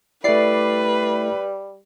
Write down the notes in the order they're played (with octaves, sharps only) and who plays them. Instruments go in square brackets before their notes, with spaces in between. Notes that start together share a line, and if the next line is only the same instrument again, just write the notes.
[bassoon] G3 [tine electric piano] A3 E4 [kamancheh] B4 [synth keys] D5 C7